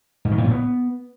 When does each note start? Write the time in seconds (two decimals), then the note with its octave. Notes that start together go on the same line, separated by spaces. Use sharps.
0.25 G#2
0.31 D#3
0.38 A2
0.44 A#2
0.51 B3